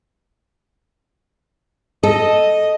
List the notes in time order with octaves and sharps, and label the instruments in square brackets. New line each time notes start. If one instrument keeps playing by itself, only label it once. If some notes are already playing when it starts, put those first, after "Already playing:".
[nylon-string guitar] A4 [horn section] D#5